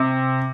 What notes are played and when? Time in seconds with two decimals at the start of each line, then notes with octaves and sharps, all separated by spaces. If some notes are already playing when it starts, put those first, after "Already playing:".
Already playing: C3